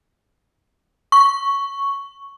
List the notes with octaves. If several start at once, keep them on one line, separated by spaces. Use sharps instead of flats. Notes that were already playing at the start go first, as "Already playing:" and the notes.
C#6